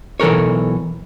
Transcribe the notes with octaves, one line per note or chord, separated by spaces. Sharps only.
B1 E3 A4 A#4 C#5